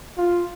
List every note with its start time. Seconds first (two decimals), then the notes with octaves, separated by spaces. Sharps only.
0.18 F4